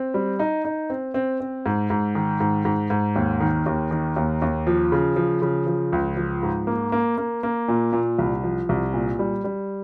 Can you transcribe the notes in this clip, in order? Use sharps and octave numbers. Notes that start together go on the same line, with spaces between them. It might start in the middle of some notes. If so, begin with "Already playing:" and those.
Already playing: C4
G3
D#4
D#4
C4
C4
C4
G#2
G#2
D#3
G#2
G#2
G#2
D#2
D#3
D#2
D#3
D#2
D#2
F3
C#3
F3
C#3
F3
C#2
F3
G#2
A#3
A#3
A#3
A#3
A#2
A#2
C2
F3
C2
A#2
G3
G3